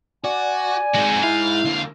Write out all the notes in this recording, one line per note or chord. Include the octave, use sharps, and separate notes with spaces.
F#4 D5 G#5
C3 G#3 D#4 F#4
E4 F5
D3 A#3